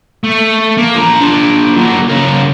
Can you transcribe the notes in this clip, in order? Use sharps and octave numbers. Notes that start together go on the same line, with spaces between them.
A3
A#3
F3 A#5
D4 F4
F#3 A#3
C#3 A#4